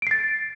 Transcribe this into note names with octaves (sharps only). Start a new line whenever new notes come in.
A6 C7 D7